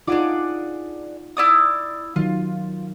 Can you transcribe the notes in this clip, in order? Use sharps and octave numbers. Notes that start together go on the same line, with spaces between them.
D4 D#4 F4 G#4 D5 F#5
E4 D5 D#6
D#3 F#3 F4